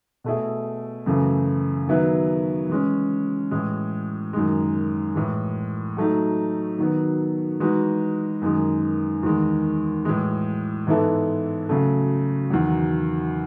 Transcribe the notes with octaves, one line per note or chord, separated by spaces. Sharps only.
B2 A3 E4 G#4
F#2 C#3 E3 A3
D#3 F#3 B3 E4 B4
E3 G#3 C#4
A2 E3 G#3
F#2 D#3 G#3
A2 E3 G#3
F#3 A3 D#4
D#3 F#3 B3
E3 G#3 D#4 F#4 B4
F#2 D#3 G#3
E2 D#3 G#3
A2 E3 G#3
G#2 E3 B3 E4 A4
C#3 F#3 A3
E2 D#3 F#3